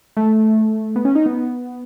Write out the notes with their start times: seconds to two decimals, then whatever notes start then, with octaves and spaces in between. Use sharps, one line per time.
0.17 A3
0.96 B3
1.05 C#4
1.15 D#4
1.26 B3